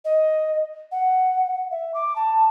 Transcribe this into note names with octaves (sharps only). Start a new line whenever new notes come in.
D#5
F#5
E5
D6
A5